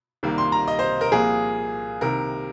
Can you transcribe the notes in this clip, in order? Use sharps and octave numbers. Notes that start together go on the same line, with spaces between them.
C2 C3 D#3 G3 A#3
C6
A#5
D#5
C5
A#4
C2 A#2 F3 A#3 G#4
C2 C3 D#3 A#4